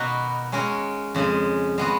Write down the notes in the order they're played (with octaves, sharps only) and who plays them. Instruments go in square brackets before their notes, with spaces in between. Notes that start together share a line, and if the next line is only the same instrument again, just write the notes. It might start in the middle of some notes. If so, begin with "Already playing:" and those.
Already playing: [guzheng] B2 A#3 D#4 F#4 B4
G#3 C#4 F#4 A#4 C#5
F2 C#3 G#3
G#3 B3 F#4